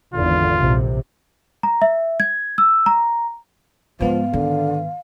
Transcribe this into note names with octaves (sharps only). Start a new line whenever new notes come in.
G#1 E2 D3 F4
A#1 C3
A#5
E5
G#6
E6
A#5
G#2 F3 G#3 B3 F5
D3 D#3